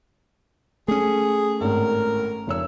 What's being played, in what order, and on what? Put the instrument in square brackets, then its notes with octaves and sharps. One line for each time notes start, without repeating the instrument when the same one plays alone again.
[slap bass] A3 C#4 [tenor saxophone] G#4
[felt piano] G#1 A2 [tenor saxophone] A#4
[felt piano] F1 C#5 E6